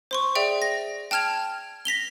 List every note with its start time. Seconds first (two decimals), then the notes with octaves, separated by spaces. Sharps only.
0.11 C5 C6 C#6
0.35 G#4 D5 E5 G5
0.62 A#6
1.11 G5 A5 F6 G#6 F7
1.85 A#6 B6 F7 G7